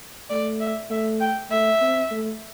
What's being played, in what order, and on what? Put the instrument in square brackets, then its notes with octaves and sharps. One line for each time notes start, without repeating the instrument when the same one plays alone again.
[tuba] A3 [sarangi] D5
[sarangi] E5
[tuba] A3 [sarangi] E5
[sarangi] G5
[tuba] A3 [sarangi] E5
[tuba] C4
A3